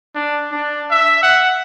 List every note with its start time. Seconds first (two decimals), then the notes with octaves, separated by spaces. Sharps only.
0.15 D4
0.52 D4
0.91 E5
1.23 F#5